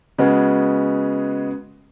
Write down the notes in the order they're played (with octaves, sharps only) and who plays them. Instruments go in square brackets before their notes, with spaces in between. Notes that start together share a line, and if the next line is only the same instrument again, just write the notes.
[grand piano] C#3 G#3 B3 F#4